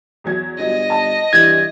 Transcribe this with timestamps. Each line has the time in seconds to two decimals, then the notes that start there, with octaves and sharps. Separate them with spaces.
0.24 E2 F#3 G#6
0.58 G1 D#5
0.90 A5
1.33 G2 E3 G#6